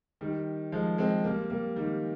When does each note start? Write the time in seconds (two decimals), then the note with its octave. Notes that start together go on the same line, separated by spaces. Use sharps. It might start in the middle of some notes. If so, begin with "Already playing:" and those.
0.21 D#3 G3
0.72 F3 G#3
0.98 G#3 C4
1.24 G3 A#3
1.50 G3 A#3
1.76 D#3 G3